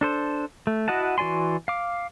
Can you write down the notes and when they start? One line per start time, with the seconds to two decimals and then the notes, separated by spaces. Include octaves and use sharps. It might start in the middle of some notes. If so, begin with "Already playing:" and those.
0.01 D4 A4 C5
0.67 A3
0.88 E4 F#4 D#5 F#5 A5
1.18 E3 F#4 D5 G#5 C6
1.68 F5 D6